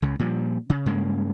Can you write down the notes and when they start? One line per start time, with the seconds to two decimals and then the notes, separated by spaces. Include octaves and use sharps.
0.02 C#2 C#3
0.19 A#2 F3 G3
0.70 C#3
0.86 G2 C#3 G#3 A#3